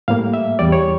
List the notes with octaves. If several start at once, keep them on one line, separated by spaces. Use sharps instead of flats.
A2 G3 A#3 F5
E5
E2 E3 G3 D5
C#5